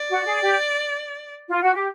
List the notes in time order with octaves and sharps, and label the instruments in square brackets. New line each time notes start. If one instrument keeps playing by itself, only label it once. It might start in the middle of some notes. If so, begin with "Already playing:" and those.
Already playing: [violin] D5
[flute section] F#4
G#4
G4
F4
F#4
G4